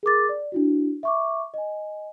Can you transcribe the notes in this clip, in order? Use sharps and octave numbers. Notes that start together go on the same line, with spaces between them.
G#4 A#4 D6 A6
D5
D4 E4 F#4
E5 C#6 D6
D#5 G#5